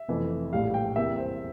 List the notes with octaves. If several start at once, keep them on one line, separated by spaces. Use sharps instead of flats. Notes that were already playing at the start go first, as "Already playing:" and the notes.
Already playing: E5
F1 F2 E3 A3
A#1 A2 G3 F5
G5
E2 C3 G3 A#3 E5
C5